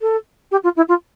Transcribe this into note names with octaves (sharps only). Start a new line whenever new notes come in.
A4
G4
F4
E4
F4